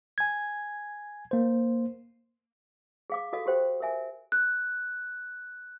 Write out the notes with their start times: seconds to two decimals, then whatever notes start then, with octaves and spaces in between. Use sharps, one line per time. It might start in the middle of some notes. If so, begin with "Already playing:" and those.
0.18 G#5 G#6
1.31 A#3 C5
3.10 G#4 F5 D6
3.33 F#4 A4 D#5 F5
3.46 F#4 G4 C5 G5
3.80 A#4 C5 E5 G#5
4.32 F#6